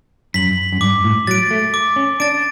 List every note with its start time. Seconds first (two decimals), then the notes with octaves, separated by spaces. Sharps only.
0.34 F#2 B6 F#7
0.72 F#2
0.81 G2 D6
1.04 A2
1.27 F#3 A6
1.31 D7
1.51 A3
1.74 D6
1.96 C#4
2.20 D4 A6 D7